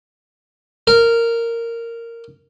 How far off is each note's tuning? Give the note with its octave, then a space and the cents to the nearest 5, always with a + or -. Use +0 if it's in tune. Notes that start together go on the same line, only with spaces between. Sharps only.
A#4 -10